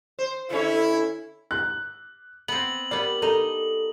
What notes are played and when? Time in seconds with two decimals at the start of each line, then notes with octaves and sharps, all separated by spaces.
0.19 C5
0.50 D3 C#4 E4 A4 C#5
1.51 F#6
2.48 B3 C4 F#7
2.91 G3 B3 A#4 D5
3.22 D#4 A4